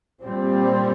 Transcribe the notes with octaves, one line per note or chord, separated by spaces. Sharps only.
A#2 G3 C4